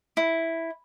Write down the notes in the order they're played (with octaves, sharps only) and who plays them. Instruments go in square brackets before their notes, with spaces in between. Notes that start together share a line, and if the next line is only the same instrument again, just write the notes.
[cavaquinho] E4